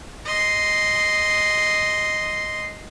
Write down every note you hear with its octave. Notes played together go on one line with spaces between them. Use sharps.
D#5 C6